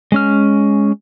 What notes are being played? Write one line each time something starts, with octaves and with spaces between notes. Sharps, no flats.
G#3 C#4 F6